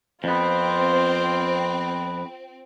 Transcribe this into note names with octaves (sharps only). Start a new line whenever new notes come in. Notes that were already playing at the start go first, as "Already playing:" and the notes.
F2 B3 C4 F4 C5